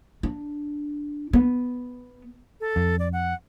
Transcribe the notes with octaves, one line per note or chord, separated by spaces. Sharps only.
D4
B3
A4
F2
D5
F#5